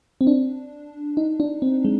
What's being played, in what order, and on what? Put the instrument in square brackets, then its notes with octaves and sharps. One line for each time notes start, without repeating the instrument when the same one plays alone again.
[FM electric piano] C4
D4
D#4
D4
C4
G#3